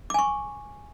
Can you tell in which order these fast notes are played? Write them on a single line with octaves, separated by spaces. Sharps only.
D6 G#5 C#6